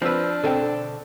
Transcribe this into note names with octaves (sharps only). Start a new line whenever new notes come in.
F3 C4 D4 B4 E6
B2 D3 C4 A4 G5